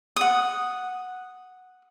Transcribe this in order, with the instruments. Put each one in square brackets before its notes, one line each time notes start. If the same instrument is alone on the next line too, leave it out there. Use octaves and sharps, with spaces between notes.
[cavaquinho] F#5 D#6